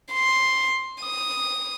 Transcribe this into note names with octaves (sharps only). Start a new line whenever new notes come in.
C6
D#6